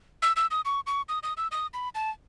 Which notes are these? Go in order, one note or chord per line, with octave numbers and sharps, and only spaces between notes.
E6
E6
D#6
C#6
C#6
D#6
D#6
E6
D#6
B5
A5